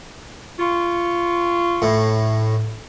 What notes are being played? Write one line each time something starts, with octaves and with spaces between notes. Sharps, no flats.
F4 C#6
A2